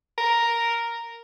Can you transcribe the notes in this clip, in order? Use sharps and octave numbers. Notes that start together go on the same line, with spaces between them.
A#4